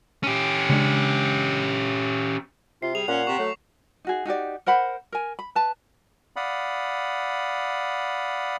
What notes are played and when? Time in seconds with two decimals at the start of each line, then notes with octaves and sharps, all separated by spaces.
0.24 C#4 G4
0.70 C#3 G#3 D4
2.82 C3 F4 C7
2.95 G3 G#4 F7
3.08 A#2 C#4 F#5 F7
3.27 C3 C#6
3.39 F#3 A3
4.05 D#4 F#4 G#4
4.25 D#4 F#4 G4 D5
4.66 A#4 C5 F#5 B5
5.12 A#4 G#5
5.39 B5
5.55 B4 A5
6.36 D5 F5 F#5 B5 D#6